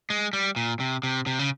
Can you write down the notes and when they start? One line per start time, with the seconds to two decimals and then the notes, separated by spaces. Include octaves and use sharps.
0.10 G#3
0.33 G3
0.56 A#2
0.80 C3
1.03 C3
1.27 C3
1.39 C#3